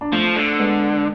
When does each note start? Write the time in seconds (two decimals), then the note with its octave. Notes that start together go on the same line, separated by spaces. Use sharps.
0.01 D4
0.12 F3 A3 C4
0.36 D3
0.59 G#3 B3